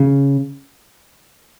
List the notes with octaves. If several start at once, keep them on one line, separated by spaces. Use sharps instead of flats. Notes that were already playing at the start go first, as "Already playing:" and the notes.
Already playing: C#3